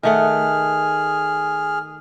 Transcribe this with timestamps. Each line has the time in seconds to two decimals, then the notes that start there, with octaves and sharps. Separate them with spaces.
0.03 D#3 A3 G#4 F#5 F6